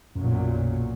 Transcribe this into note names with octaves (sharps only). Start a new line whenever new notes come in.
B1 F#2 A#2 F#3